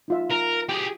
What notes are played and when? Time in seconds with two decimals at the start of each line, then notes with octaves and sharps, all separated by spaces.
0.08 D#4 F4 E5
0.31 A#4
0.69 G4 G#4 G5